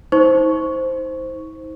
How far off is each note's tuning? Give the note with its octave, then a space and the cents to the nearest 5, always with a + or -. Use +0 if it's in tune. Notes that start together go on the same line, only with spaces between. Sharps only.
D#4 +45 C5 +0 C#6 +5